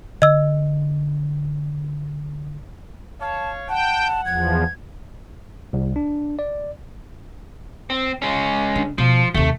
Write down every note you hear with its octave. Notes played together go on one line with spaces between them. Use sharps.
D3 D#5 E6
C#5 F5 A5
F#5 G5 A5
E2 F3 G#6
C2
D4
D5
C4
G#3 C#4
D3
B2 F3
D#2 C3 A3